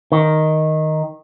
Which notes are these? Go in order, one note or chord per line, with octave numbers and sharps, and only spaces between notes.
D#3